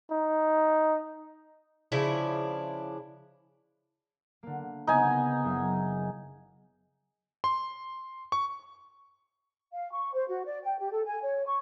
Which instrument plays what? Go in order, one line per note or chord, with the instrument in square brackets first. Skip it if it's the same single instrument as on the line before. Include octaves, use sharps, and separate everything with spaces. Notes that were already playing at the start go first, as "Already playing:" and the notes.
[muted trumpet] D#4
[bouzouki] C#3 F3 D4 E4
[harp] D3 A#3
[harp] C#3 B3 C4 [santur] D#4 G#5
[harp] F#1 E5
[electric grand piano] C6
C#6
[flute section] F5
C#6
C5
F#4
D5
G5
G4
A4
G#5
C#5
C#6